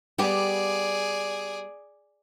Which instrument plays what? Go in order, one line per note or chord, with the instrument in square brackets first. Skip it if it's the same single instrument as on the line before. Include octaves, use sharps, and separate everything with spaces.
[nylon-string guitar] G3 B3 G4 [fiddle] G#4 D5